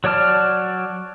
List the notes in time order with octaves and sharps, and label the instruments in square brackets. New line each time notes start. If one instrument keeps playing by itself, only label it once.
[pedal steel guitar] F#3 C#5 D5 A5 F6